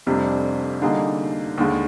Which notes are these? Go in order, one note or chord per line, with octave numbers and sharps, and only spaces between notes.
F1 F2 C3 G3 D4
D3 G3 A#3 D#4 G#4
D#2 D3 G#3